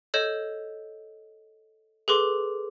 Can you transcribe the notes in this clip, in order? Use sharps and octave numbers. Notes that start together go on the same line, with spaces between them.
A4 C#5 D#5 G6 E7
G#4 A4 B4 C6 D6